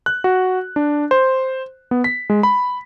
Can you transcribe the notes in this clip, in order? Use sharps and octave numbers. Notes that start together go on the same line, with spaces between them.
F#6
F#4
D4
C5
B3
B6
G#3
B5